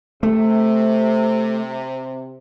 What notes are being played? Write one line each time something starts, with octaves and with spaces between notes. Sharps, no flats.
C3 A3